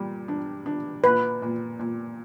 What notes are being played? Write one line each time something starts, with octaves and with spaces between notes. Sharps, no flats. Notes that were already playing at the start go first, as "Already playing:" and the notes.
Already playing: A#2 G3
D4
D4
A#2 B4
A#2
A#2